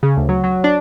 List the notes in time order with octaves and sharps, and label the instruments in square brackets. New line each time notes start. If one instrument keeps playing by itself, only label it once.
[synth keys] C#3
D2
F#3
F#3
D4